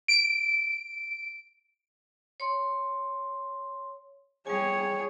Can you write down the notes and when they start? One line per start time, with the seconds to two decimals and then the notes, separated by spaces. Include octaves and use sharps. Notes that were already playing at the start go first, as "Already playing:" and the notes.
0.08 D7
2.40 C#5 C6
4.47 G3 G#4 C#5 G#5